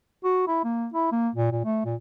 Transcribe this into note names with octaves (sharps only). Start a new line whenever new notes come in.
F#4
E4
A#3
E4
A#3
A#2
A#2
A3
A#2